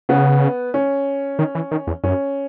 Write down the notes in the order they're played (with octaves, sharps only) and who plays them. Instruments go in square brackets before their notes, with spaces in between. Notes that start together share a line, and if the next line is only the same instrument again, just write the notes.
[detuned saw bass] C#3 [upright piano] B3
[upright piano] C#4
[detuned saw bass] D#3
E3
D#3
E2
[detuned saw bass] F#2 [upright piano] C#4